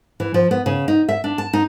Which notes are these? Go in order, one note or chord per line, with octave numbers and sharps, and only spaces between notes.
E3
F3
B3
C#3
D#4
E5
D4
A5
D#4